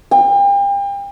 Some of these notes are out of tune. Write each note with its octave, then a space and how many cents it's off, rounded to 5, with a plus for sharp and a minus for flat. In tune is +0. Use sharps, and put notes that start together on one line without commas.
G5 +35